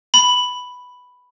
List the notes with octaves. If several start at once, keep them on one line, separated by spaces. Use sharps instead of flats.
B5